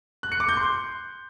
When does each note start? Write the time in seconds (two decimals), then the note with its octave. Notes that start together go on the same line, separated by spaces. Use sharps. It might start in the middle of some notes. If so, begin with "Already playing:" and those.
0.23 F#6
0.32 C#7
0.40 D6
0.49 G6
0.57 C6